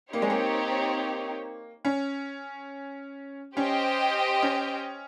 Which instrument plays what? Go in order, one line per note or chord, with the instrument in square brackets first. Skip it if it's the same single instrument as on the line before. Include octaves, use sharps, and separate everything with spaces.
[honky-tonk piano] A#3 [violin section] C4 D#4 G4 C#5
[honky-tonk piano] G#3
A#3
C#4
[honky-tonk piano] C#4 [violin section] G4 C5 D#5 G5
[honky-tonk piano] C#4